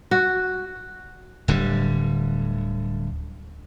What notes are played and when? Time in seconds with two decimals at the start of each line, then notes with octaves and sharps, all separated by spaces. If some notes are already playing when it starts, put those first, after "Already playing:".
0.11 F#4
1.48 D1 D3 G3